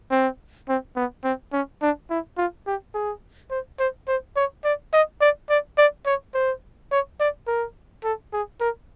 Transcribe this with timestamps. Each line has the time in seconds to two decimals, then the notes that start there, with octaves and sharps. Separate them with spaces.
0.11 C4
0.69 C4
0.96 B3
1.24 C4
1.53 C#4
1.82 D4
2.10 E4
2.38 F4
2.67 G4
2.94 G#4
3.51 C5
3.79 C5
4.08 C5
4.36 C#5
4.64 D5
4.93 D#5
5.21 D5
5.50 D5
5.78 D5
6.06 C#5
6.34 C5
6.92 C#5
7.20 D5
7.48 A#4
8.04 A4
8.33 G#4
8.61 A#4